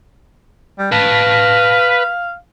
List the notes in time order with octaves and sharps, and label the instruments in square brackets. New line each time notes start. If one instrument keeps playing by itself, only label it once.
[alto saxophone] G3
[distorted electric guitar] B4 A5 [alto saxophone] F5